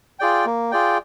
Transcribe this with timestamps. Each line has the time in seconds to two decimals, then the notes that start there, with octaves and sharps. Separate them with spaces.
0.19 F4 G#4 D5 G5
0.45 A#3
0.71 F4 G#4 D5 G5